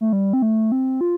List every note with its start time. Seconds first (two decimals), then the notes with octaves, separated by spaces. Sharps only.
0.01 A3
0.13 G3
0.33 C4
0.42 A3
0.72 C4
1.01 F4